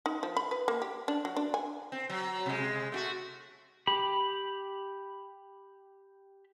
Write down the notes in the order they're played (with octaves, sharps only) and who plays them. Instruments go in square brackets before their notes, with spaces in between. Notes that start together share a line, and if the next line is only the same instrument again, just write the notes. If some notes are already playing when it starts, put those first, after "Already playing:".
[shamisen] D#4
F3
B5
B4
A#3
G4
D4
F#3
D4
G#5
[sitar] C4
F#3
C3 G#3
A3 F4 F#4
[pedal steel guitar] G4 B5